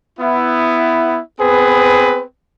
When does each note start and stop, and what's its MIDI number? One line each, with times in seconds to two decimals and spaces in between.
0.20 1.20 59
0.20 1.20 64
1.40 2.23 59
1.40 2.23 60
1.40 2.23 68
1.40 2.23 71